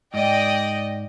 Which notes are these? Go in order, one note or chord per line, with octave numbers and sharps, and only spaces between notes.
G#2 D5 D#5 G5